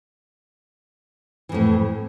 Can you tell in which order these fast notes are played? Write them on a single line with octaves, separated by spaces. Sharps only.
E3 F2 A2